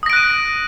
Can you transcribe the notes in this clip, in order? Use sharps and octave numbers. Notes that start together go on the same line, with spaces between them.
D#6 F#6 A#6 D7 D#7